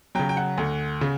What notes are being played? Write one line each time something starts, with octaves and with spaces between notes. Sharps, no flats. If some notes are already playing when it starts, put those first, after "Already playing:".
C#3 F#3 G5
G5
F#5
D2
C#3